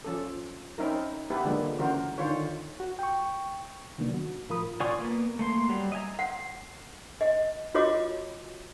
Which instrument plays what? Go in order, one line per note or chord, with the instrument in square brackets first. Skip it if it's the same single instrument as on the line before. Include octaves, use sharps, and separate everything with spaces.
[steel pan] F3 C#4 A4
C4 C#4 D#4 E4 A#4
B3 E4 G4 B4
D3 F3 G#3 A#3
C#3 E3 F#4 A#4 C5
D3 D#3 F4 C5 C#5
[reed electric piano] F#4
G5 C#6
[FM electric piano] C3 D#3 F#3 A#3 B3 D4
F#4
A2 F3 F4 A#4 B5 D#6
[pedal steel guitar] F4 D5 G#5 C#6 D#6
A#3 B3
A3 A#3 C6
F#3 G3
D#5 E5 G#5 A#5
[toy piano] F#5
D#5
F4 F#4 C#5 D#5 D6